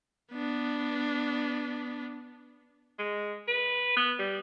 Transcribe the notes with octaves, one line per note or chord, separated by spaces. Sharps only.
B3 D4
G#3
B4
B3
G3